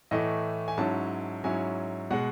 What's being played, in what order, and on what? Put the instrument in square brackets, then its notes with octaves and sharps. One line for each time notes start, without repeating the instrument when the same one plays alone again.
[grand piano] A2 E3 A3 D#5
G#5
G#2 F#3 C#4 E4 A5
G#2 F#3 C#4 E4 G#5
B2 G#3 F#5